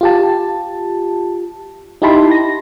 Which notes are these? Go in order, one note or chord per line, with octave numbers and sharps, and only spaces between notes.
F4 G4 A5
D#4 E4 G4 A5 B5 C6
A#6